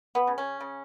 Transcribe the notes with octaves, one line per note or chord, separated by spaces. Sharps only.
B3
C#3
C#4
C#3